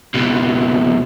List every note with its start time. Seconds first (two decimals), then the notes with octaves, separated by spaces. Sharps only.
0.14 C#2 B2